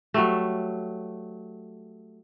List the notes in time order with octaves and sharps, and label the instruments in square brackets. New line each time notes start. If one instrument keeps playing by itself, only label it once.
[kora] F#3 G3 A3